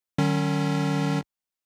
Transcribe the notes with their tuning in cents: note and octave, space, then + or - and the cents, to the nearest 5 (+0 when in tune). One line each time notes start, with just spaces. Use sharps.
D#3 -45 F#3 +35 C#4 +0